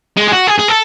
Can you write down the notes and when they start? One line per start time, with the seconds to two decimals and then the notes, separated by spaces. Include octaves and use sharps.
0.17 G#3
0.28 G#4
0.32 F#4
0.47 G#4
0.58 G#4
0.68 A4